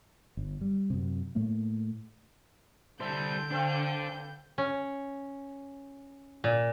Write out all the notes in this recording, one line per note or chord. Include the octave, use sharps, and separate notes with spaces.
G1
G3
F#2 C3
A2 A3 A#3
D3 G3 C5 E5 A5 G6
B3 C4 D4 A4 C5 F5
C#4
A#2